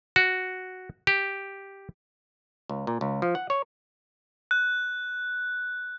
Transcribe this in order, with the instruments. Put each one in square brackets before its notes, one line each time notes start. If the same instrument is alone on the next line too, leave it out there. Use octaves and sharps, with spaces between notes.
[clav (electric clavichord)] F#4
G4
C#2
A#2
C#2
F3
F#5
C#5
[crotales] F#6